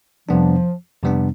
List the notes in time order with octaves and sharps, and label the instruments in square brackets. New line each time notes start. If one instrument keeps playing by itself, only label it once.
[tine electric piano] F2 C3 G3 B3 D4 [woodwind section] F3
[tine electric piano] F2 C3 G3 B3 D4